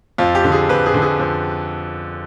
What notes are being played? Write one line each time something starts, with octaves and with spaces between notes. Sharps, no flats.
F2 F4
G4
D3
G#4
F2 B4
G#4
D3
G#4
F2